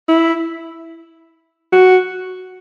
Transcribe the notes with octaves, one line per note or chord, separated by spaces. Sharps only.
E4
F#4